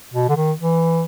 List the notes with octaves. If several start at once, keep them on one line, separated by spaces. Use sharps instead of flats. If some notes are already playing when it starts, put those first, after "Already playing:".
B2
D3
D#3
E3